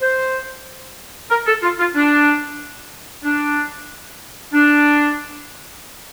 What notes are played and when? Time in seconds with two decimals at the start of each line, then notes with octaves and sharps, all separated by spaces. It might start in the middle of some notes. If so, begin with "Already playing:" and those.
0.01 C5
1.30 A#4
1.47 A4
1.62 F4
1.79 F4
1.95 D4
3.24 D4
4.53 D4